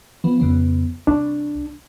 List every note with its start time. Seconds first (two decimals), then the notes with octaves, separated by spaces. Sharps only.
0.24 F3 B3
0.40 F2 C#3 B3
1.07 C2 D4